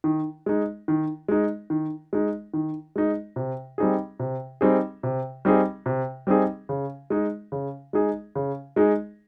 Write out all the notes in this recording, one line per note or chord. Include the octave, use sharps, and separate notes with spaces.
D#3
G#3 D#4
D#3
G#3 D#4
D#3
G#3 D#4
D#3
G#3 D#4
C3
G3 C4 D#4 G#4
C3
G3 C4 D#4 G#4
C3
G3 C4 D#4 G#4
C3
G3 C4 D#4 G#4
C#3
G#3 D#4 G#4
C#3
G#3 D#4 G#4
C#3
G#3 D#4 G#4